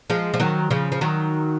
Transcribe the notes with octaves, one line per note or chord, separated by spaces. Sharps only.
F3 G#3
F3
D#3 F#3
C#3 F3
F3
D#3 F#3